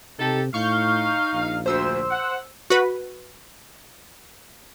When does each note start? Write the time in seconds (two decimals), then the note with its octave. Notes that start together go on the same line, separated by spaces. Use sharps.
0.20 C3 D#4 G4 A4
0.54 A2 D#4 F5 C#6 F6 G6
1.33 A#1
1.66 D2 C5 E6
2.11 F#5
2.70 F#4 B4